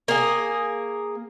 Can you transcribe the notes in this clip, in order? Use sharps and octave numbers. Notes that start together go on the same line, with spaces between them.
A#3 G#4